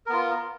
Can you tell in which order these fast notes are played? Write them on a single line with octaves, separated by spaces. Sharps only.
A#4 B3 F4